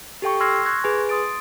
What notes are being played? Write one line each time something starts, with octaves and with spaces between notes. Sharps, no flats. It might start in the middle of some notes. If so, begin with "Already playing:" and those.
G4 A4 G5 C#6
C6 E6 F6 G#6 A#6 C7
C6 C#6 F#6 G#6 A#6
G#4 B4 G#5
C6 D#6 A6 D7